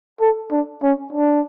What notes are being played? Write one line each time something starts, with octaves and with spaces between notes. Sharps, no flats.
A4
D4
C#4
D4